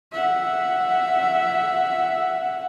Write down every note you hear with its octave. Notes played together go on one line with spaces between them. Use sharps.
E5 F#5